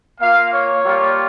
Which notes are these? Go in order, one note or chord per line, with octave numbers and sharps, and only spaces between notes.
A#3 F4 F5
C#5
G3 A#3 F4